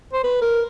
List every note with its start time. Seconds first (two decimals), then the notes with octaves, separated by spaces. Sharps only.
0.13 C5
0.24 B4
0.42 A#4